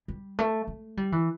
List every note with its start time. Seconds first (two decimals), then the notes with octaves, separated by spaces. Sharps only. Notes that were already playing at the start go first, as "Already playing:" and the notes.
0.08 G3
0.39 A3
0.67 A3
0.97 G3
1.12 E3